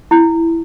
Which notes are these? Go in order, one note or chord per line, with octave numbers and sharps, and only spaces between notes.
E4